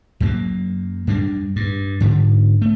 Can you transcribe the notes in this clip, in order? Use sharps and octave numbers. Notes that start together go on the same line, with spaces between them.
F#2 F#3 G#3 A#3
F#2 G3 G#3 D4
G2
G#2 D3
A3